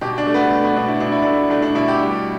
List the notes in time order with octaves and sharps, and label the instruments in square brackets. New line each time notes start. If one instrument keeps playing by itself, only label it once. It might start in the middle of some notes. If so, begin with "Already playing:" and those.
[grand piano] B2 G4
D4
A3
B3
A3
B3
B2 D4
E4
B2 D4
E4
A3 D4
A3 D4
D4
B2 E4
G4
G3